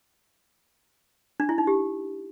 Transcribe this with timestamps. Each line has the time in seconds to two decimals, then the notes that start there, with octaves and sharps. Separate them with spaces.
1.40 D4
1.49 E4
1.58 D#4
1.67 G4